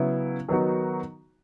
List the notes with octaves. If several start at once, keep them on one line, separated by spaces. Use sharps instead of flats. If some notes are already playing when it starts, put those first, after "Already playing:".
Already playing: C#3 F#3 B3 E4
D#3 F#3 B3 D#4 F#4